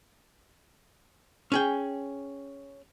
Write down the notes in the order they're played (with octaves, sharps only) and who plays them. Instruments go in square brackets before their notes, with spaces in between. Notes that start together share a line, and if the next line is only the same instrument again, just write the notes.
[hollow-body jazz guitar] C#4 G#4 G5